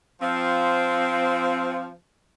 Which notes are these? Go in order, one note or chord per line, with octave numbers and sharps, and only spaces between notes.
F3 C4